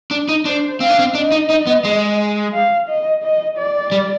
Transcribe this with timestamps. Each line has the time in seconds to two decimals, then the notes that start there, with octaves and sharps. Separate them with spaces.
0.11 D4
0.29 D#4
0.45 D4 C5
0.80 C4 F5
0.90 D4
0.99 C4
1.14 D4 D#5
1.32 D#4
1.50 D#4
1.67 B3
1.84 G#3
2.54 F5
2.88 D#5
3.23 D#5
3.58 D5
3.92 G3